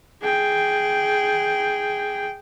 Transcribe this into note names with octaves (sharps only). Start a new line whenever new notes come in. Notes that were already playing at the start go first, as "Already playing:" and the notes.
G#4 G5